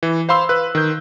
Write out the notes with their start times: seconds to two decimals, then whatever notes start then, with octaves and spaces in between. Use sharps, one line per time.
0.03 E3
0.29 C5 F5 B5 C6 E6
0.49 B4 F#6
0.75 D#3 G6